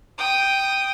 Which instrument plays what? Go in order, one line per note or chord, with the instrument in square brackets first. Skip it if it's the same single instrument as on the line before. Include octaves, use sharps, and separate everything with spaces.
[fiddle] G5 D#6